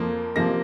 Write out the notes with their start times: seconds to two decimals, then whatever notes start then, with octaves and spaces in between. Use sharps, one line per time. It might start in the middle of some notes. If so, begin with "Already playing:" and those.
Already playing: F2 F3 A#3
0.36 C3 F3 A#3 A#6